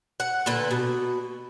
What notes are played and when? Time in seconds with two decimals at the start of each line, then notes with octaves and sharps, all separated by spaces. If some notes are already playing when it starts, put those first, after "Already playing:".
0.20 F#5
0.46 A#2 D3 B4
0.71 B2